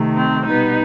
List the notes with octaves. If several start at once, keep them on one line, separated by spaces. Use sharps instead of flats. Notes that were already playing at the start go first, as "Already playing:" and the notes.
Already playing: C3 D#3 A3
C4
B2 G3 B3 D#4